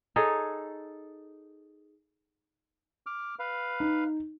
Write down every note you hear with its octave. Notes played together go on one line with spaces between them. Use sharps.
D#4 G#4 A4 C#5
D6 F6
B4 F5
D#4